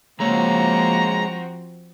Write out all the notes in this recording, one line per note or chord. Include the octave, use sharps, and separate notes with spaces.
F3 G#3 A#3 C4 F#4 C#5 A#5